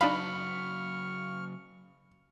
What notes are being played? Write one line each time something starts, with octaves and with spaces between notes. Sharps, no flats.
C#3 F#3 D4 D#4 F5 B5 C#6 F6